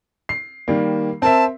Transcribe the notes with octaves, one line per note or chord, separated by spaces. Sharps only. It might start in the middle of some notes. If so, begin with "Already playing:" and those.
C7
D#3 G3 A#3
C4 A#4 E5 A5